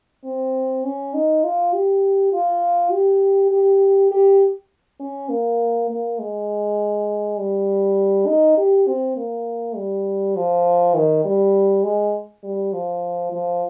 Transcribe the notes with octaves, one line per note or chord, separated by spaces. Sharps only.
C4
C#4
D#4
F4
G4
F4
G4
G4
G4
C#4
A#3
A#3
G#3
G3
D#4
G4
C4
A#3
G3
F3
D#3
G3
G#3
G3
F3
F3